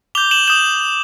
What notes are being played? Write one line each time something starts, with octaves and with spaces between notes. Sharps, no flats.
D6 G6 F7 G7
E7 F#7
D#6 G6 E7 F#7